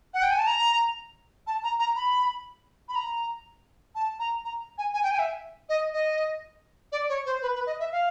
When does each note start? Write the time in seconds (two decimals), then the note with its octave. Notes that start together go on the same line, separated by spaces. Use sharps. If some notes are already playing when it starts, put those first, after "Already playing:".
0.14 F#5
0.22 G5
0.30 G#5
0.39 A5
0.47 A#5
1.47 A5
1.64 A#5
1.79 A#5
1.96 B5
2.89 B5
2.95 A#5
3.95 A5
4.19 A#5
4.45 A#5
4.78 G#5
4.93 G#5
5.03 G5
5.11 G#5
5.19 E5
5.69 D#5
5.93 D#5
6.92 D5
7.09 C#5
7.26 C5
7.42 B4
7.55 B4
7.66 D#5
7.80 E5
7.92 F5